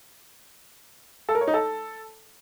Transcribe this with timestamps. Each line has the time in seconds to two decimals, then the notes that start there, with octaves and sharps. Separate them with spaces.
1.29 A4
1.35 A#4
1.41 C#5
1.47 D#4
1.54 A4